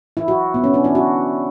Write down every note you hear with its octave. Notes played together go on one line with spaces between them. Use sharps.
E4
F#4
B3
C#4
D4
E4
F#4